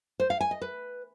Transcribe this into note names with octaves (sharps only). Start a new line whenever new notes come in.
C5
F5
G#5
D#5
B4